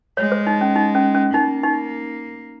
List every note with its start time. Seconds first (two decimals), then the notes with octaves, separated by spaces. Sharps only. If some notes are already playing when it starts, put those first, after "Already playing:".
0.17 G#3 C#5
0.32 C5
0.47 D#4
0.61 C#4
0.76 D#4
0.95 C#4
1.15 C#4
1.34 A#3 D#4
1.63 D#4